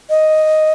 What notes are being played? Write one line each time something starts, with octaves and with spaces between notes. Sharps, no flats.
D#5